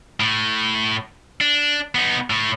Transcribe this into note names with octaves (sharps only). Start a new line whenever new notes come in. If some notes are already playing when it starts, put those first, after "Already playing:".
A2
D4
B3 D#4
A2